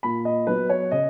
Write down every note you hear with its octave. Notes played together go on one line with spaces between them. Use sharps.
A#2 B5
D#5
F#3 B3 B4
C#5
C#3 D#5